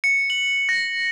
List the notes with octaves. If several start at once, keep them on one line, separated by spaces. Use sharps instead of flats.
C#7
F#7
A#6